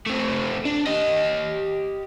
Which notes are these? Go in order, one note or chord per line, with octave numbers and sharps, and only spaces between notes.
A3 C4
D4
G4 D#5